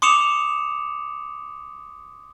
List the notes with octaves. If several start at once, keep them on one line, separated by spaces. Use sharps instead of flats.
C6 D6 D#6 C#7 E7 F7